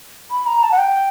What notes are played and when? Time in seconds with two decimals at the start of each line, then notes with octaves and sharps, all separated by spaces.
0.31 B5
0.47 A#5
0.63 A5
0.72 F#5
0.78 G5